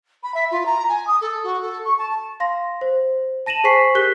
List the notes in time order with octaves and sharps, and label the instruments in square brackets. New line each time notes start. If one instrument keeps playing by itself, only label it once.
[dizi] B5
E5
F4
A#5
G#5
D#6
A4
F#4
A4
C#6
A5
[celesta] F5 C6 A#6
C5
A5 A#6 D#7 E7 F#7
G#4 C5 G#5 C#6 B6 C7
G4 A#4 F#6 G6 B6 G7